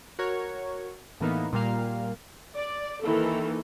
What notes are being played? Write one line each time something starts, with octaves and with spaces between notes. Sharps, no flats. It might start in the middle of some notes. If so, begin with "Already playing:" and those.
F#4 A#4 C#5
A2 E3 A#3 B3 D#4
A#2 G3 A#3 F5
D5
D#3 E3 A#3 A4